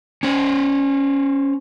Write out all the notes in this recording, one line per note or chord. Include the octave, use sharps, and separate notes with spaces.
C#4 C5